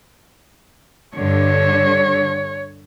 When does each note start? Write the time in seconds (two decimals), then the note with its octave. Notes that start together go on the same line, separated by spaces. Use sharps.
1.18 G2 D3 C#5